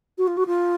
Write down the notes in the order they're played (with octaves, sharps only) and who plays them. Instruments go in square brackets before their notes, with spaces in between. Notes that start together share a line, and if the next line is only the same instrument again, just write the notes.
[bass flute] F#4
F4
F#4
F4